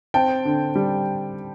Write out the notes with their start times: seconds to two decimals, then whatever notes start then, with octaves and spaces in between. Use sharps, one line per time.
0.14 C4 G5 A5
0.45 D3
0.75 G3